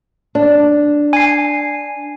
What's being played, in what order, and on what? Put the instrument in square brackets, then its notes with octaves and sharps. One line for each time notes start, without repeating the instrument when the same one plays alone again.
[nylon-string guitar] D4
[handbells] G#5 C7